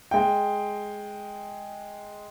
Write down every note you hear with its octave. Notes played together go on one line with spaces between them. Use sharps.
G#3 G5